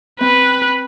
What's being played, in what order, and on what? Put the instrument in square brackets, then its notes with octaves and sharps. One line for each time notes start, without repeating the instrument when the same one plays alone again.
[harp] C4 [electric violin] B4